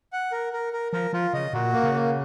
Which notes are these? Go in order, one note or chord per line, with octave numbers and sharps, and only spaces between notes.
F#5
A#4
A#4
A#4
F3 A#4
F3 F4
C#3 D#5
A#2 F#4
A#3
C#3
A#3